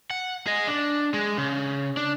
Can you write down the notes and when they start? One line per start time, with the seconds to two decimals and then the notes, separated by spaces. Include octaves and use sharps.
0.11 F#5
0.46 G#4 D#5
0.67 D4
1.14 G#3
1.38 C#3
1.97 D4